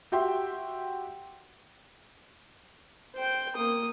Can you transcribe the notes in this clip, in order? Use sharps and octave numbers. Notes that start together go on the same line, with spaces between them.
F#4 G4 E5 G5 C6
C5 G5
A#3 D#6